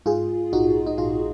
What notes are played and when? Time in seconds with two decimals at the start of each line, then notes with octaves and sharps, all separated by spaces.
0.06 G#2 F4 G#4
0.52 A#1 D#4 F#4
0.87 D#4
0.98 A#1 F4